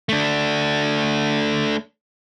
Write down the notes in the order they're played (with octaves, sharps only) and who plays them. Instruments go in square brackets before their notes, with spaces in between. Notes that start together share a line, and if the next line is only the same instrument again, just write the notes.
[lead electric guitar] A3 D4